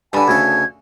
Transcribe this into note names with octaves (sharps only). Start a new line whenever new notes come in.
G2 D3 B3 G#5 A5 B5
D2 C#3 A4 G#6